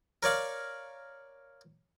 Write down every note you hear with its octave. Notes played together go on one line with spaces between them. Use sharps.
A#4 C#5 D5 F5